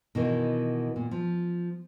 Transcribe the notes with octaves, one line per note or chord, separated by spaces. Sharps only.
B2 D#3 E3
A#2
F3